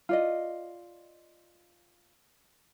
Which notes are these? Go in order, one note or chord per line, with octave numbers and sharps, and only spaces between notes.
F4 D5 D#5